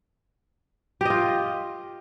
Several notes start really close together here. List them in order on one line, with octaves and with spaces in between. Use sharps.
G4 D#5 F4